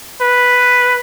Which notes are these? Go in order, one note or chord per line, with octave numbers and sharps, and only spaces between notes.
B4